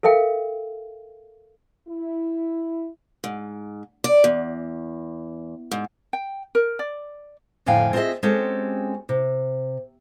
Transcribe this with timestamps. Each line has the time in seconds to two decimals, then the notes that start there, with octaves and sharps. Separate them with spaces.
0.03 A4 A#4 E5 F5 G5
1.88 E4
3.24 G#2
4.04 D5
4.24 E2
5.71 G#2
6.13 G5
6.55 A#4
6.79 D5
7.66 F2 A2 D3 F5 G5 G#5
7.93 C4 F4 G#4 A4 D#5 E5
8.23 G#3 C4 C#4 F#4 G4 A4
9.09 C3